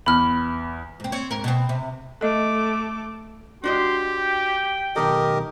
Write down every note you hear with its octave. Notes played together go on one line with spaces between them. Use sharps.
E2 B5 F6
G#2 C4
C4 C#5
G#2 A#4
B2 C4
C3
A3 A4 D#5 D6
D4 F#4 G4 D#5 C6
G5
B1 D#3 G4 A4 A#4 D#5